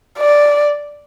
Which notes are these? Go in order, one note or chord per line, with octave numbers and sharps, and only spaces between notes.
D5